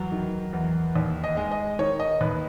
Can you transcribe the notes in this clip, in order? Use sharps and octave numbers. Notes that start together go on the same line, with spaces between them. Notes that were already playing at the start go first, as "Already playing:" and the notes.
Already playing: E2 F#3
D#3
E2
D#2
D#5
G#3
D#5
D#3 C#5
D#5
D#2 B4